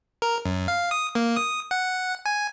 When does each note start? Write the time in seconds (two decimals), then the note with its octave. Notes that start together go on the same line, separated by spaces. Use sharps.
0.22 A#4
0.45 F#2
0.68 F5
0.91 D#6
1.15 A#3
1.36 D#6
1.71 F#5
2.26 G#5